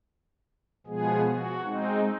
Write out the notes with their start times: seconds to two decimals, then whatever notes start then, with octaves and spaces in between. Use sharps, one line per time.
0.87 B2 F3 G#3 B3 G#4
1.27 F#4
1.63 G#3 C4 D#4